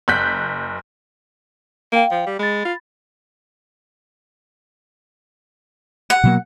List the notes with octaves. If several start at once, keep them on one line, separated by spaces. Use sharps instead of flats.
F#1 F#6 G6 B6
A#3 F5 G5
F3
G3
G#3 B5 A6
F4
F#5
B2 F#3 A#3